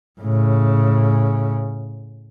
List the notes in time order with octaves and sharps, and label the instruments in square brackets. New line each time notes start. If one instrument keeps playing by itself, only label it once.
[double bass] A2 C#3